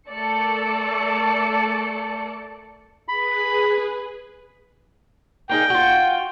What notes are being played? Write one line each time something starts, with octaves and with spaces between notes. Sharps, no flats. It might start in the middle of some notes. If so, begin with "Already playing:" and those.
A3 A4 A#4 D5 D6 C#7
G#4 B4 B5
A#3 D#4 G#4 G5
F4 F#4